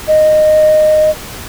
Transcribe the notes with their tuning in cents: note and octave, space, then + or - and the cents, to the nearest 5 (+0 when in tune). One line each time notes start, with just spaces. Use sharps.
D#5 -15